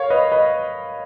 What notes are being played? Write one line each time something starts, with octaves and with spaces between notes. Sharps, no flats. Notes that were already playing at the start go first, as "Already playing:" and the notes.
Already playing: A#4 C#5 F5
B4 D#5
B4 D#5